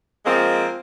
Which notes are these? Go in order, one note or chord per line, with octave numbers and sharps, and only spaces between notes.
F3 G#3 A#3 C4